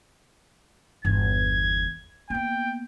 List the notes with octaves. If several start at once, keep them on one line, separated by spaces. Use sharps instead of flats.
G1 E2 G#6
A#3 B3 G5